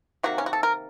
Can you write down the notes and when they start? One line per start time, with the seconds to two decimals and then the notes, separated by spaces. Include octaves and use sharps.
0.23 C3 D#3 A#3 F#4
0.38 C#4
0.46 F#4
0.53 A4
0.63 A#4